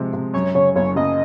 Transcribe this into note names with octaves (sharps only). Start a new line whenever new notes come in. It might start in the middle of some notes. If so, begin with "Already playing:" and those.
Already playing: C3 F3 G#3
C3
F#2 C#5
C#3 C#5
F#1 C#5
F#1 D#5